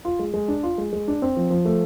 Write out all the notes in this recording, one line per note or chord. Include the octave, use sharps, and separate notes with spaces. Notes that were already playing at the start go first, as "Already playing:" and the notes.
F4
G#3
G#3
D4
F4
G#3
G#3
D4
C4
F3
F3
A3